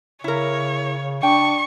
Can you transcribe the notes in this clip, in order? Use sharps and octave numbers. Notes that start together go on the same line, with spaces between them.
C#3 E4 A#4 C#5
D4 G5 C#6